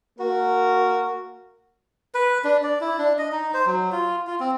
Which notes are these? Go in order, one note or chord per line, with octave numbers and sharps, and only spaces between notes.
A#3 F#4 A#4
B4
D4
D5
E4
D4
D#5
D#4
C5
F#3
F4
F4
C4